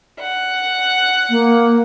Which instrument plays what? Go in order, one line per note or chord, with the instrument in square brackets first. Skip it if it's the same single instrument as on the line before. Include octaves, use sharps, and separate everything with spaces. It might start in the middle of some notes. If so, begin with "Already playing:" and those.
[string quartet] F#5
[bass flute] A#3